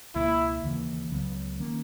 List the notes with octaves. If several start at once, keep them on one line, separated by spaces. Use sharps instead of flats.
C#2 B2 A#3 E4
D#2 C#3 E3 A#3
C#2 C#3 F#3 B3
D#3 A#3 C#4